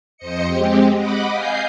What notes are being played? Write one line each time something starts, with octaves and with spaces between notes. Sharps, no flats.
F2 C5 D#5 C#7
G#3 C4 G4
D#5 F#5 B5 D6
D#5 F5 G#5 D#6 G6 C7